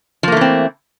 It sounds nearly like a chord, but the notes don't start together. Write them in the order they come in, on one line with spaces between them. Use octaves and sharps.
F3 A#3 A3 E3 C4